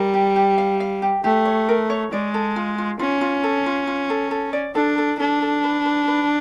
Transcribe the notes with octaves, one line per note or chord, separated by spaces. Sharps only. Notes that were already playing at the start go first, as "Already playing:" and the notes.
Already playing: G3 A#4
G4
G4
F5
F5
G4
A3 G4
C#5
A#4
C#5
G#3 D5
A4
F4
F4
C#4 F4
F4
A4
F4
F4
A4
A4
D5
D4 A4
A4
D4 A4
A4
B4
B4
B4